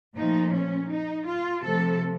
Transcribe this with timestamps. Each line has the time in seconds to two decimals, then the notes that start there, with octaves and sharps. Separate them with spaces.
0.16 A#2 F3 A3 D#4
0.53 C#4
0.90 D#4
1.26 F4
1.63 C3 F3 A3 A4